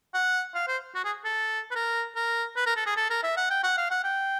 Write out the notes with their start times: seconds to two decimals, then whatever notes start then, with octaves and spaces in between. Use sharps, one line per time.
0.14 F#5
0.55 F5
0.68 C5
0.95 F#4
1.04 G#4
1.25 A4
1.71 B4
1.75 A#4
2.16 A#4
2.56 B4
2.66 A#4
2.76 A4
2.86 G#4
2.97 A4
3.10 A#4
3.24 E5
3.37 F#5
3.51 G5
3.63 F#5
3.78 F5
3.91 F#5
4.04 G5